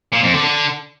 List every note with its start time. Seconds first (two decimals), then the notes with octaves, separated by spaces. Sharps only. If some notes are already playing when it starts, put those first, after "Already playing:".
0.13 A#2
0.23 F2
0.34 D3
0.44 D3